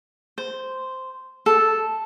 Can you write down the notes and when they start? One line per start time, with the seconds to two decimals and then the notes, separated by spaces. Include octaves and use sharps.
0.38 C5
1.46 A4